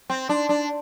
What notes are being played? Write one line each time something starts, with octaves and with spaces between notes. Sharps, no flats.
C4
D4
D4